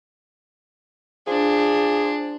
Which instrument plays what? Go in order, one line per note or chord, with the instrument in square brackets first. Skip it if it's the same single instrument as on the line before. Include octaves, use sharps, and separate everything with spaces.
[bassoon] F3 [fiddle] D4 [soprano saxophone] G#4